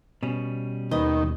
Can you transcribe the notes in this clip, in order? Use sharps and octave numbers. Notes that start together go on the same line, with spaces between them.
B2 G3 C#4
D#2 D#3 B4 D#5